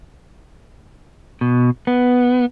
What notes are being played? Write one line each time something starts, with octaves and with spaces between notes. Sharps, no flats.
B2
B3